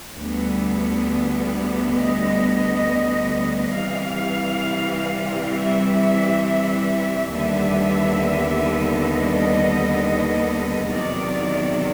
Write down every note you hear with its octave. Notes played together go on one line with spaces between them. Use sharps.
D2 D3 G3 B3
D#5
C3 E3 G3 F5
E5
D#2 D3 G3 B3 E5
D#5
E2 C3 D#3 F#3 D5